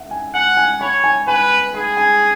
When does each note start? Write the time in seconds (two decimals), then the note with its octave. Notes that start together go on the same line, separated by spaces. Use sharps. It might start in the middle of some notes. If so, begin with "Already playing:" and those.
Already playing: E5 F#5
0.11 G#5
0.34 F#5 G#5
0.57 G#5
0.81 C#5 B5
1.04 G#5
1.27 B4 G#5
1.75 G#4 B5
1.97 G#5